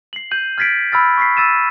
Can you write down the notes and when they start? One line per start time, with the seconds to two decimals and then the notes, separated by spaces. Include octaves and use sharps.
0.13 C7 F#7
0.31 G6 D#7 F#7
0.58 F6 G#6 A6 B6 C7 D7
0.92 B5 E6 F6 A6
1.17 C#6 B6 C7
1.37 E6 A6 D#7 E7